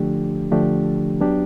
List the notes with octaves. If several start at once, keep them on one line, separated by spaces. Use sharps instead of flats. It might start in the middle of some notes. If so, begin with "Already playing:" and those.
Already playing: D3 F3 A3 D4 G4
D3 F3 A3 D4 G4
F#3 B3 D4 G4